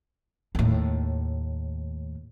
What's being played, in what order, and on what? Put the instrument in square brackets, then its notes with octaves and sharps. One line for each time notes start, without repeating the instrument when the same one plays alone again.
[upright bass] D#2 A2